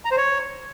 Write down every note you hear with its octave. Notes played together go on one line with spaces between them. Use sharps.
A#5
C5
C#5